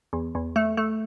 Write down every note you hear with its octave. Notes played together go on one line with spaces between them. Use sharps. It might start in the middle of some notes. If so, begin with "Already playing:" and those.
E2
E2
A3
A3